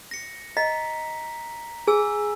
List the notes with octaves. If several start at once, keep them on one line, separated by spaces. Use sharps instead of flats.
A#6 C#7
D#5 A#5 B6
G#4 G#5 E6